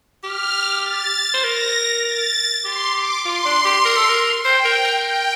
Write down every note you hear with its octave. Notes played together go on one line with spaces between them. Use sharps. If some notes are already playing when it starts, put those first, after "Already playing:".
G4 F6
A6
C5
A#4 A#6
A6
G4 C6
D6
F4 C6
D4
G4
A#4
A4
A#4
C5 G5
A#4
A#4
G5